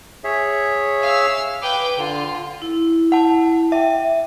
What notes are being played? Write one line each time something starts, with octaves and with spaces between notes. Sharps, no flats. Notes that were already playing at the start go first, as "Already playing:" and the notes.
G#4 C#5 E5
F5 E6
B4 G5 D6
D3 F4
E4
F#5 A5
E5 G5